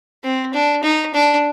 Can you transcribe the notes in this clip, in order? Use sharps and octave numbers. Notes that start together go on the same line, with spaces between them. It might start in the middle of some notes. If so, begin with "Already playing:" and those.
C4
D4
D#4
D4